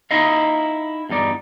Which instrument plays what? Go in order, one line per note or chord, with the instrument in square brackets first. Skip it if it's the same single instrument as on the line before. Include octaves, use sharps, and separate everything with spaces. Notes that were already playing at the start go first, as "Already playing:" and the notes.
[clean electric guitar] D#4 E4 D#5 F5
E2 G2 D#4 D5